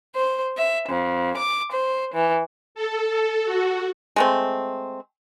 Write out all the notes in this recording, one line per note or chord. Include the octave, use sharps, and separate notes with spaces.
C5
E5
F2
D6
C5
E3
A4
F#4
G#3 A3 C4